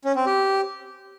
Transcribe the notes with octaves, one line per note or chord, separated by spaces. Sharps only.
C#4
C4
G4